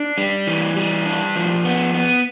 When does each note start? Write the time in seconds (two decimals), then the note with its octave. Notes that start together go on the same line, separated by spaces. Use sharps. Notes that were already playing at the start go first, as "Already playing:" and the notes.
Already playing: D4
0.18 G3
0.47 E3
0.76 G3
1.06 D4
1.36 F3
1.65 B3
1.94 B3